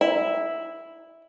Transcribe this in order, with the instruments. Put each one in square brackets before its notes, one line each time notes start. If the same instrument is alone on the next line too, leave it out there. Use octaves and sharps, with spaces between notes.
[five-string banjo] E4